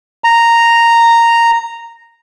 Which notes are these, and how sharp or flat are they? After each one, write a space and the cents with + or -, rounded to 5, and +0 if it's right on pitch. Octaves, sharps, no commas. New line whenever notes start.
A#5 -5